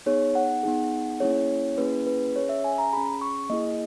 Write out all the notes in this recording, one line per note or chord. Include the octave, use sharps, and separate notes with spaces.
B3 D#4 G#4 C#5
F#5
B3 D#4 G#4
A#3 C#4 E4 G#4 C#5
A#3 C#4 E4 G#4 B4
B4
C#4 G#4 C#5
E5
G#5
A#5
C#4 G#4 B5
C#6
A#3 E4 G#4 D#5